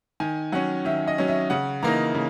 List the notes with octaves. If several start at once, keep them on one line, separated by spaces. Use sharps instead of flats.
D#3 G#5
F#3 C#4 F#5
D#3 E5
D#5
F#3 C#4
E5
C#3 F#5
E3 A#3 D#4 A#5
C#3